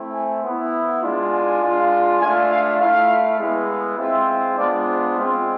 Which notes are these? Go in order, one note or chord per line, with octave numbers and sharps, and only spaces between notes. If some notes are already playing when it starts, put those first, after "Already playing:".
Already playing: A3 C4 E4
G#5
B3 E4
G#3 D4 F4
G#5
G#3 D4 F4
A3 D4 F4 G#5
F5
A3 E4 F5
G#3 B3 E4
G#3 C4 F4 E5
G#3 B3 D4 F4 D5
C5
G#3 C4 F4